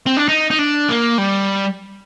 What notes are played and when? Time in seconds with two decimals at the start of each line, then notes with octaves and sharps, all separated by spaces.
0.06 C4
0.17 D4
0.28 D#4
0.50 D#4
0.59 D4
0.89 A#3
1.18 G3